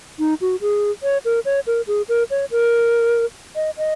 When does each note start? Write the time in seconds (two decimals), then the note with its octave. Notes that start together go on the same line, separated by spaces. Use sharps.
0.19 D#4
0.41 F#4
0.61 G#4
1.03 C#5
1.25 A#4
1.45 C#5
1.67 A#4
1.87 G#4
2.09 A#4
2.31 C#5
2.51 A#4
3.56 D#5
3.78 D#5